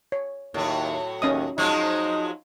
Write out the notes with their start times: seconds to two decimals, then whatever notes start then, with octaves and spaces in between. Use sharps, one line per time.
0.12 C#5
0.54 D#2 A2 F#3
1.22 D#2 C#4 D#5 D#6
1.58 F3 F#3 G#3 D#4